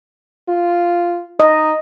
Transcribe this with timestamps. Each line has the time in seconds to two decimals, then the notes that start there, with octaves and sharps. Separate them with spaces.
0.49 F4
1.40 D#4 D#5